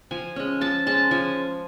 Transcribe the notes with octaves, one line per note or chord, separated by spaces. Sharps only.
F3 G#5
G#3 C#4
F3 A5
G#3 C#4 A5
F3 G#5